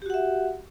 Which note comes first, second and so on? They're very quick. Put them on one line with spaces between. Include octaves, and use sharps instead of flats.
G4 F#4 F#5 E5